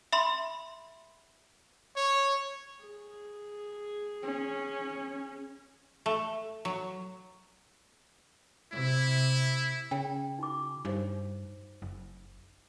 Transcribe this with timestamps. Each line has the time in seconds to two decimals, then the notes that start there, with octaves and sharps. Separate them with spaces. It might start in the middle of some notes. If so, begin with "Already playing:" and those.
0.12 E5 B5 C6
1.96 C#5
2.85 G#4
4.23 C#4
6.06 A3
6.65 F#3
8.73 C3 E4
9.91 C#3 G5
10.39 D#4 F#4 D6
10.85 G2 D#4 C5 C#5
11.82 F#1